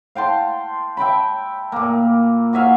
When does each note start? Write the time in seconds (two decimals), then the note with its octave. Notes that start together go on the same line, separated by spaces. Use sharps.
0.15 F5 G5 A5 C6
0.97 E5 G5 A5 B5
1.72 A#2 A#3
2.53 F#4 G#4 E5 F5